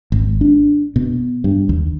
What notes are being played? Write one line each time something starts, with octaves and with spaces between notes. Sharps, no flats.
G#1
D4
B2
G2
D#2